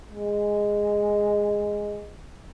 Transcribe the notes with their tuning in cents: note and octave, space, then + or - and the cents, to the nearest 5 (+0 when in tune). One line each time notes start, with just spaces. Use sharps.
G#3 -5